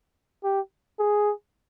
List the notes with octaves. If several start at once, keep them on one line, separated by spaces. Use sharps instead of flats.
G4
G#4